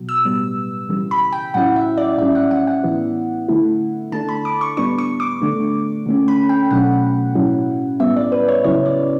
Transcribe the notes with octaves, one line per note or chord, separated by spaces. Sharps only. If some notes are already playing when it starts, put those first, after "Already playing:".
Already playing: B2 F#3
E6
A2 G3 B3
C#3 E3 G3
B5
G5
A2 F#3 C#4 E4 F#5
E5
D5
A2 G3 C#4 E5
F#5
F#5
F#5
A2 E3 B3 E4
D3 A3 E4
D3 A3 D4 A5
B5
D6
C#6
A2 G3 B3 D4 C#6
C#6
D6
D3 A3 D4
D3 A3 C#4
B5
G5
B2 F#3 A3 C#4 F#5
A2 F#3 C#4 E4
A2 G3 B3 E5
D5
B4
C#5
C#3 F#3 C#4 E4 C#5
D5